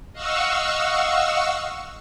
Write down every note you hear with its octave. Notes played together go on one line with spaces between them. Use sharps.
D#5 F5 F#5 C#6 E6